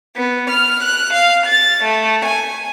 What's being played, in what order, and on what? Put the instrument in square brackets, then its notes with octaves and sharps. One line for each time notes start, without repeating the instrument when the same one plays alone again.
[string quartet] B3
F6
F#6
F5
A6
A3
G#5